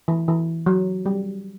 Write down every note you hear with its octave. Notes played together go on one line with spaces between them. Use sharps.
E3
E3
F#3
G3